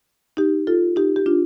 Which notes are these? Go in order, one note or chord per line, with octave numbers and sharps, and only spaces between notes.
D#4 G4
F4 A4
D#4 G4
G4
D4 F4